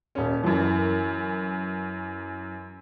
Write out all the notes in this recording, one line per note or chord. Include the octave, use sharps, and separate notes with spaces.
D#1 C#4
F#2 E3